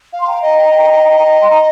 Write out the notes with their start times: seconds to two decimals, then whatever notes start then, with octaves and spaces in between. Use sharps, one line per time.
0.13 F5
0.20 C6
0.27 G5 A#5
0.42 D#5
1.43 C6
1.51 A#5